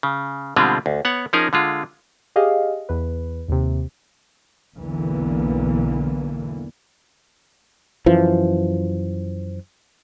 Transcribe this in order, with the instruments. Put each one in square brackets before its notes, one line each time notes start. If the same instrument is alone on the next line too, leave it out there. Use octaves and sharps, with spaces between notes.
[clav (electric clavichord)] C#3
B2 D3 G3 G#3 C4 F4
D2
B3 C#5 F#5
F3 C#4 D#4 G#4 A#4
D3 G#3 F4
[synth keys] G4 G#4 D#5 F5
E2 B4
D#2 C3
[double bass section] B1 E2 D3 E3 A#3 B3
[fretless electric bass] F#2 E3 F3